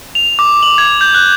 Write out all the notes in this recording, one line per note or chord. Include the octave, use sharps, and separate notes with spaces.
F7
D6
F#7
G#6
G6
F#6